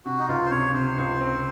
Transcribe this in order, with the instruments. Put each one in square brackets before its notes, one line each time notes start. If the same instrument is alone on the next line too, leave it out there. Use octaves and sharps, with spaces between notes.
[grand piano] C3 [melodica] F#4
[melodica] D#4
[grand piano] C#2 [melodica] F4
[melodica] C5
[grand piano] C3 [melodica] C#5
[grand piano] C3 [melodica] C5
[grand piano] C#2
C4